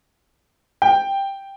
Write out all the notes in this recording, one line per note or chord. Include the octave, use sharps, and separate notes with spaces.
G5